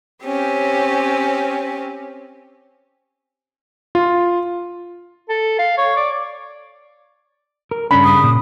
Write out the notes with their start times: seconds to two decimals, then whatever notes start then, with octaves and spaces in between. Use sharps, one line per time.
0.23 C4 C#4 G4
3.95 F4
5.29 A4
5.59 F5
5.78 C#5
5.96 D5
7.71 A#4
7.91 G2 C#3 D4 B5
8.04 D#6
8.24 A#2